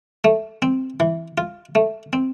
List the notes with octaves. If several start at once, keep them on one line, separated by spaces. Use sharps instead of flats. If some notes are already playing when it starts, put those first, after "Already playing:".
A3
C4
E3
F4
A3
C4